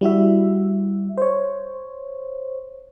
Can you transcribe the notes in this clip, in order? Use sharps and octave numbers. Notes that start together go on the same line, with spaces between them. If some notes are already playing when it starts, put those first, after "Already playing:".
G3 E4 F#4 E5
C5 C#5